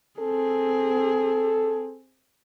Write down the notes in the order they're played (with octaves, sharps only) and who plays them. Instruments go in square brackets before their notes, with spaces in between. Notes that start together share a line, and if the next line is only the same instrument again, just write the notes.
[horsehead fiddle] C4 G#4 [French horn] A4